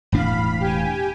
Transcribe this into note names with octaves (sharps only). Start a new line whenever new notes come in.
E1 A2 D4 F5 B5
G4 G#5